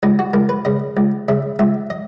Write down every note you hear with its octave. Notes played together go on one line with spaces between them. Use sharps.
C#2 D#4
F#4
C#2 A#4
B4
C#3 D#5
C#2
C#3 E5
C#2 E5
D#5